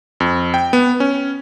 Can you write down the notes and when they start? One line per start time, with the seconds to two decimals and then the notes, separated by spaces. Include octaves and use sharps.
0.20 F2
0.54 G5
0.73 B3
1.00 C#4